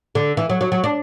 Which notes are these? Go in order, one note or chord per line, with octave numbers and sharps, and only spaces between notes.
D3
E3
F#3
F#3
F#3
D4